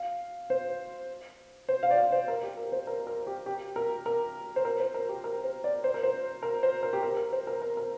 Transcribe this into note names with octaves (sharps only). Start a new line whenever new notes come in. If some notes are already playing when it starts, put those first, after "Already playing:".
Already playing: F5
C5
C5
F5
D5
F5
C5
A#4
G4
A#4
C5
A#4
A#4
G4
G4
A#4
A#4
C5
A#4
C5
A#4
G4
A#4
C5
D5
C5
A#4
C5
A#4
C5
A#4
G4
A#4
A#4
C5
A#4
A#4
A#4